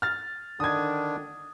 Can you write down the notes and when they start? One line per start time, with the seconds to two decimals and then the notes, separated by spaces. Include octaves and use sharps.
0.02 F6 A6
0.60 D3 D#3 D4 D#6 G#6